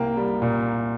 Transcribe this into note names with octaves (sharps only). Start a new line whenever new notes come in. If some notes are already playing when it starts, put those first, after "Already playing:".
Already playing: C2 A#3 G5
G3
A#2